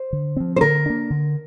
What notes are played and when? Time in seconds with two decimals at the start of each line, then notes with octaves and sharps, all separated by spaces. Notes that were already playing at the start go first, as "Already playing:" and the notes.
Already playing: C5
0.13 D3
0.37 F3 C4
0.56 C5
0.61 D3 A#4
0.86 A#3 D4
1.10 D3